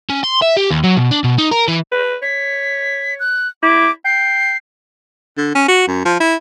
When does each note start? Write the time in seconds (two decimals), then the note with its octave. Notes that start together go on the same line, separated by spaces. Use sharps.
0.10 C#4
0.24 C6
0.42 E5
0.57 G4
0.71 D#2
0.84 F#3
0.96 B2
1.11 D4
1.24 B2
1.38 D#4
1.51 A#4
1.68 E3
1.92 B4
2.22 C#5 B6
3.20 F#6
3.63 E4 D6
4.05 G5 C7
5.37 D3
5.55 C#4
5.68 F#4
5.88 F#2
6.05 F3
6.20 E4